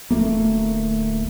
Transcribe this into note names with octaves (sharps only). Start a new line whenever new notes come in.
D1 A3 A#3